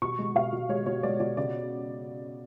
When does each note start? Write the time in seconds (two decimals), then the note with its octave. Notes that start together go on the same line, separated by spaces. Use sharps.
0.02 B2 C#6
0.19 G#3
0.35 B2 F5
0.53 B2
0.69 G#3 C#5
0.86 B2 C#5
1.03 G#3 D5
1.20 B2 D5
1.37 C#3 D5